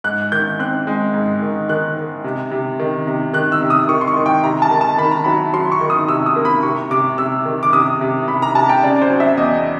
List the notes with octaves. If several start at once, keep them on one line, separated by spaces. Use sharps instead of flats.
G#2 F#6
D#3 G6
C4 F#6
G#3
G#2
D#3
D#3 F#6
D#3
C3
C3
D#3
C3
D#3 F#6
E6
C3
D#6
D#3 C#6
C6
C#6
D#3
G5
C3 A#5
A5
D#3
A5
D#3 B5
A#5
F#3 B5
F#3 C6
C#6
D#3
D#6
C3 E6
D#6
A#3
B5
C3 C#6
C3 D6
C3 E6
D#3
D6
C3 D#6
C3
C3 B5
A#5
C3 A5
G5
C#3 D5
C5
F#3
E5
E2 D#5